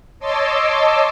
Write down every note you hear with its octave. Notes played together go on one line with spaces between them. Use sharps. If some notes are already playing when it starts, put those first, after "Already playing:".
C#5 D#5 A5 C6 D6 E6